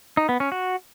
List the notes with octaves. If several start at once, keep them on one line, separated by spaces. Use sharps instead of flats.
D#4
B3
C#4
F#4